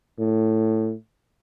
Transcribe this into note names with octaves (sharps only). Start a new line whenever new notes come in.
A2